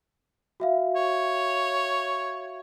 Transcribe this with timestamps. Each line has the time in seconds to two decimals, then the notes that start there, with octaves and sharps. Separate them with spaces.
0.60 F#4 E5 F5
0.96 C#5